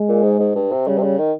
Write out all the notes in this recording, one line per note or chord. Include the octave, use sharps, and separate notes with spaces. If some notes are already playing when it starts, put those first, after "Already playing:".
Already playing: G#3
A#2
G#2
G#2
G2
C3
C#3 G3
C3
C#3
D#3